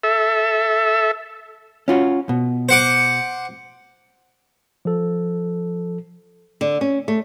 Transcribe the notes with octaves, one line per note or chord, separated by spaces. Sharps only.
A4 E5
C#4 F4 F#4
B2
C5 F#5 D6
F3 A4
D3
C#4
A3